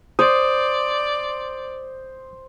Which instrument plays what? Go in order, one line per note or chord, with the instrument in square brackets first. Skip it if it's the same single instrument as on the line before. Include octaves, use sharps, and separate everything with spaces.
[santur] C5 [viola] D5 [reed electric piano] D#6